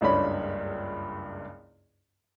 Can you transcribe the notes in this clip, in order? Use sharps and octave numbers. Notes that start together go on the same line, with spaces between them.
F#1 C#2 G2 D4 C#5 B5